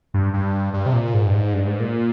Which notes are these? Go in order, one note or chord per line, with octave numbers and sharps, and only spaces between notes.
G2
G2
G2
C3
A#2
G#2
G2
G#2
G2
G#2
A#2